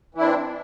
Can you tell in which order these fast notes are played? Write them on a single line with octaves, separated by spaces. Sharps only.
E3 E4 D4 C4